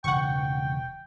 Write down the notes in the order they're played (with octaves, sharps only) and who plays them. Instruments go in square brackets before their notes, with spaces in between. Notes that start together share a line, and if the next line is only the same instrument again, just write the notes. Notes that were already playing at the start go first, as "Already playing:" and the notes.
[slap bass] E1 C#3 E3 [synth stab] F#5 C#6 [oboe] G5